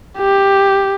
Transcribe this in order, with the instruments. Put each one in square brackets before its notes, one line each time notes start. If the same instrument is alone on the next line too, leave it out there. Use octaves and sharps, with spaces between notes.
[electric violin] G4